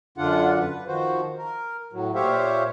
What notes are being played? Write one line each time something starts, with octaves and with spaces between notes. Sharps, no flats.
F#2 D3 D4 F4 F#5
B4
D#3 F3 F#4 C5
A#4
A2 F#3
A#2 G4 C5 C#5 E5 F5